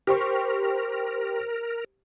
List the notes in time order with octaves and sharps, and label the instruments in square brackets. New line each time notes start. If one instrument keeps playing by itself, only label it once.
[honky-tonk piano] G4 C5 C#6 [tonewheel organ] A#4